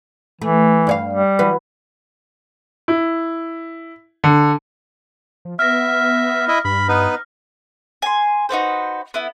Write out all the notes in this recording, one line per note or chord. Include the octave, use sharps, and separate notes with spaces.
E3 A3
G2 C#5 F5
G3
E3 F#3 B4
E4
D3
F3
B3 E5 F6 A#6
E4 D#5 E5
G2 B5
B3 D#4 B4
G#5 C6
D#4 F#4 B4 C5
B3 E4